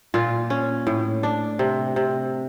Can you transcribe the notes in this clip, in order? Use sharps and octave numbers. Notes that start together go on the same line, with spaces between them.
A#2 F4
C#4
A2
D4
C3
C3